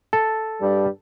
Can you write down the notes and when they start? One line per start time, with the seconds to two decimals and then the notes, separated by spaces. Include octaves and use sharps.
0.13 A4
0.61 G2 G3